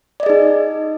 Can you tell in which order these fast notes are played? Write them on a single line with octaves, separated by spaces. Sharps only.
D5 D#5 G#4 D#4